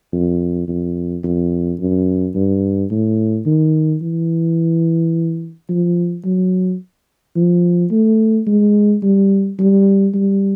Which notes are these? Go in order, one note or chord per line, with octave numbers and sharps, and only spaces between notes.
F2
F2
F2
F#2
G2
A2
D#3
E3
F3
F#3
F3
A3
G#3
G3
G3
G3